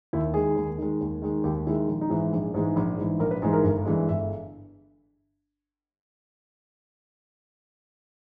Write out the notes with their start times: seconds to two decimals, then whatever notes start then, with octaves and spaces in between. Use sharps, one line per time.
0.13 D#2 E4
0.34 D#3 G#3 G#4
0.56 D#2
0.78 D#3 G#3
1.01 D#2
1.22 D#3 G#3
1.44 D#2 G4
1.67 D#3 G#3 E4
1.88 A#1
2.01 D#4
2.10 G#2 E3 G#3 E4
2.33 A#1 G#4
2.54 G#2 E3 G#3
2.76 A#1
2.98 G#2 E3 G#3
3.19 A#1 A#4
3.31 B4
3.42 G#2 E3 G#3 G#4
3.53 A#4
3.63 G1
3.85 G2 E3 G#3
4.08 G1 E5